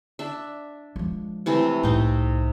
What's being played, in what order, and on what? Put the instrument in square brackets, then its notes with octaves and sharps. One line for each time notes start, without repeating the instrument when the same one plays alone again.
[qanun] D4 E5
[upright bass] F3 G#3
[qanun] C3 E3 A3
[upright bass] C2 A2 [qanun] C4 D#4